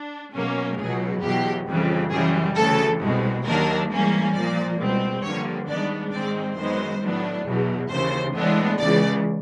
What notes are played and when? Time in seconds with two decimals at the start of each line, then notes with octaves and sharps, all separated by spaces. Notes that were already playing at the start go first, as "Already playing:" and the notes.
Already playing: D4
0.33 B2 F#3 A#3 C#4
0.78 C#2 B2 F#3 G#4
1.22 E2 B2 F#3 G4
1.66 F2 C#3 E3 G3
2.11 F#2 C#3 E3 G3 G#4
2.56 D2 C#3 E3 A4
3.00 C2 B2 G#3
3.44 D#2 D#3 F#3 A#3 D4 A#4
3.90 G#2 E3 G3 A#3 C#4
4.33 A#2 F3 A#3 D5
4.78 C#2 B2 G3 C4
5.23 G2 D3 F3 A#3 C#5
5.67 G#2 D#3 G3 B3 D4 D5
6.11 G#2 D#3 G#3 C4 D5
6.56 F#2 D#3 G#3 B3 C5
7.01 A2 F#3 B3 D4
7.45 E2 B2 F#3
7.89 D#2 C#3 E3 C5
8.34 A2 E3 G#3 B3 D4
8.79 C#2 C#3 E3 G#3 D5